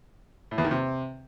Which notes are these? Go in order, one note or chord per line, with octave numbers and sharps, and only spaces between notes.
A2
E2
D#3
C3